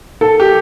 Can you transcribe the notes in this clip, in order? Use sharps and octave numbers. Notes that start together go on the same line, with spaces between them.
A4
G4